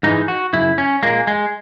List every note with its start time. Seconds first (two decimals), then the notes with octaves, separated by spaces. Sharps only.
0.03 G#2 E3 G#3 D#4
0.28 F#4
0.53 F#2 C#3 E4
0.78 C#4
1.03 A#2 G#3 A#3
1.27 G#3